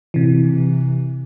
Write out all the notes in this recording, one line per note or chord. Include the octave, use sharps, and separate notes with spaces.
C3 E3